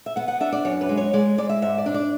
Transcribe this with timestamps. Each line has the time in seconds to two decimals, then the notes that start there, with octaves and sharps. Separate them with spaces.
0.06 E5
0.16 B3 F#5
0.28 F#5
0.40 D4 E5
0.53 D5
0.65 F#2 C#5
0.81 B4
0.89 G#3
0.97 C#5
1.13 G#3 D5
1.38 G#3 D5
1.49 E5
1.62 G#2 E5
1.78 D5
1.86 D4
1.94 D5